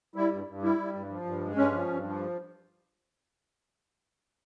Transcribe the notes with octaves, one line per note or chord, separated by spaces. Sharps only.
G3 E4
G2
G2
G3 E4
G3
G2
F3
G2
G#3
G2 C#4
F3
G2
F3